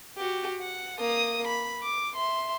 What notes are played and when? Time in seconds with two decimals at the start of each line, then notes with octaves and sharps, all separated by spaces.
0.18 F#4 G4
0.62 F#5
1.00 A#3 D#6
1.47 B5
1.83 D6
2.16 E5 C6